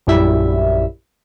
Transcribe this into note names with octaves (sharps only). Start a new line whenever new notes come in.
A#1 F#2 G3 E4 E5